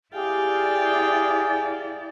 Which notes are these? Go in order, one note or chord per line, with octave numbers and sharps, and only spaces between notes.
E4 G4 G#4 D5 F5 G5